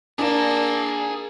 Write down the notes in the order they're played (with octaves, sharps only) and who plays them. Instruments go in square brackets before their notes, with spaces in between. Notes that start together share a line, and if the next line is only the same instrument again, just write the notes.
[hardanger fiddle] A#3 [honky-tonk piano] D4 D5 [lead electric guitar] G#4 A5